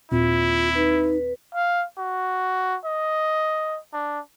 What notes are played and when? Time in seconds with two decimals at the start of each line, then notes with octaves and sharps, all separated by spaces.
0.11 D#2 A#2 C4 E4 F4
0.75 D#4 B4
1.55 F5
1.98 F#4
2.85 D#5
3.93 D4